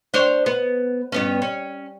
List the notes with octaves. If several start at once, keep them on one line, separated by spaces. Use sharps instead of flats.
D4 C5 C#5
B3
G2 B3 C#4
C#4